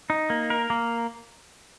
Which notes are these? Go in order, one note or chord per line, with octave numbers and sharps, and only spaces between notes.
D#4
A#3
A#4
A#3